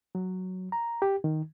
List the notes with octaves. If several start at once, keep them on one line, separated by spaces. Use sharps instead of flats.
F#3
A#5
G4
D#3